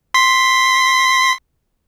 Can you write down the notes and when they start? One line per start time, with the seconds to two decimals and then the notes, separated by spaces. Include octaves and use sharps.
0.14 C6 B6